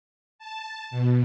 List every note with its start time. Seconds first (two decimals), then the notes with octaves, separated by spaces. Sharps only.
0.39 A5
0.91 B2